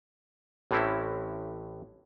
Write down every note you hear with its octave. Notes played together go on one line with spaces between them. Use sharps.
A1 A2 E3 C4 C#4 E4